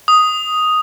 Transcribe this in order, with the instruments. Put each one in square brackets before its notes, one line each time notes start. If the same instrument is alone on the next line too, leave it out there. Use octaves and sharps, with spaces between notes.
[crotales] D#6